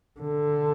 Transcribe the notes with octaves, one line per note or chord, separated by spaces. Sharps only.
D3